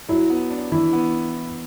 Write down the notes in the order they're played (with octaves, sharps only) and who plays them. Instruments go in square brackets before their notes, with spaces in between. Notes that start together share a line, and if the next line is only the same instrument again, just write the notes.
[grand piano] F#3 [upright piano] E4
[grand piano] B3
D4
[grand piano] E3 [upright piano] E4
[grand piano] B3